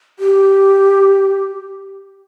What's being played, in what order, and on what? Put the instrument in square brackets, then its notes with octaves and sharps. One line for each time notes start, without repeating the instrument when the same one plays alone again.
[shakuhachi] G4